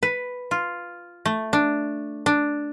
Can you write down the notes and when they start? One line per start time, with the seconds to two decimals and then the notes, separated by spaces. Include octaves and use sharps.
0.03 B4
0.51 F4
1.26 A3
1.53 D4
2.26 D4